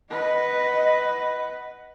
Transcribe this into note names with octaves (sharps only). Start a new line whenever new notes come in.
B4 D#5 F#5